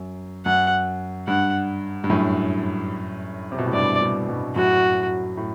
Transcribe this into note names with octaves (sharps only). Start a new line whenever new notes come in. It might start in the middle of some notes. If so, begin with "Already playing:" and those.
Already playing: F#2
F#2 F#5
G2 F#5
G2
F#2 A2
C3
B2
A2
G2 D5
G2 B2
G2 B2
F#2 A2 F#4
A2